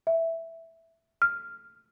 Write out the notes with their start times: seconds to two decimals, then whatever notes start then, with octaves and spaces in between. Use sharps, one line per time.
0.07 E5
1.22 F6